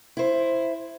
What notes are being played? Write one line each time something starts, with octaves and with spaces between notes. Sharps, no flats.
E4 C5